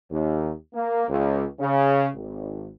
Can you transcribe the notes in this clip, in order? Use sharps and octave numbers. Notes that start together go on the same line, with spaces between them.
D#2
A#3
C#2
C#3
G#1